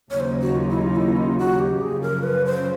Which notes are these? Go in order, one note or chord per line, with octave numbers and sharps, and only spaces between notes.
D#2 C#3 F#3 A#3 D#4 C#5
C5
F#4
F4
E4
F4
E4
F4
F#4
G4
F#2 C#3 F3 G#4
A#4
B4
C5